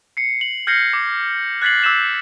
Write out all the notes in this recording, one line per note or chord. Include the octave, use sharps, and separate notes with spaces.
C7 C#7
F#7
F6 G6 G#6 A#6 C7 C#7
D6
F#6 G#6 A6 B6 C7 F#7
D6 E6 G6 B6 E7 F#7